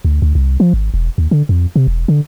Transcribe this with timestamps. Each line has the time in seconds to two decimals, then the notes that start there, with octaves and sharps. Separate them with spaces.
0.05 D2
0.22 D2
0.35 C2
0.60 F3
0.73 G#1
0.94 E1
1.18 D#2
1.31 D3
1.49 F2
1.76 C3
1.87 E1
2.08 D3